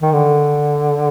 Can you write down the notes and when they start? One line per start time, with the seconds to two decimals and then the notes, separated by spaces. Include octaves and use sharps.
0.02 D#3
0.13 D3